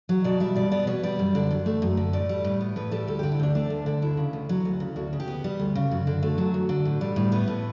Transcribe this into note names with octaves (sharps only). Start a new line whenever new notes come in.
F#3
B2 D5
G3 E5
B2 D5
B3 D5
B2 C#5
G3 D5
F#2
D3
F#2
A3
F#2
D3
A2 D5
G3
A2
B3
A2 B4
G3 A4
D2 A4
D3 G4
E4
D2 D4
A3 D4
D2
D3
D2 E4
C#3
D2
F#3
D2
C#3
D2 F#4
C#3
G4
B3
G3
D2
C#3
F#2 F#4
D3
A3
F#3
F#2
D3
A2
G3
A2
B3 B4
A2